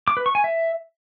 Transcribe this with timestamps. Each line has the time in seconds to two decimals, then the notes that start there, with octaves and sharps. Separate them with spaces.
0.08 D6
0.17 B4
0.26 C#6
0.35 G#5
0.44 E5